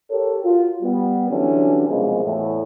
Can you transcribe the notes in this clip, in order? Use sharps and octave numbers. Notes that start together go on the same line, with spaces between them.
G4 A4 A#4 C#5
F4 F#4 A#4
G3 B3
D3 E3 F#3 G3 C#4 D4
C2 F#2 B2 F3 G#3
E2 A2